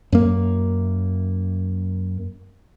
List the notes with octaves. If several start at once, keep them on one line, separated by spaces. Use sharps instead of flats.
F#2 A#3